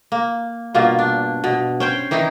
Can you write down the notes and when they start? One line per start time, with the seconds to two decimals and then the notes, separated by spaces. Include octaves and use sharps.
0.12 A#3
0.75 G2 B2 A#3 F4
0.99 D4
1.44 B2
1.80 C#4 C5 G5
2.11 D#3 E3 D#4 E4